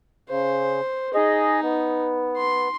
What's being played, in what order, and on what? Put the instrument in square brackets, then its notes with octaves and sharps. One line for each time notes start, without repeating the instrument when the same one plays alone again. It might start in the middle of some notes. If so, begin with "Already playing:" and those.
[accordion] C#3 [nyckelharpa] C5
[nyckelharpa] D#4 [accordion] G#4 D#5
[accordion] B3
[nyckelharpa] C6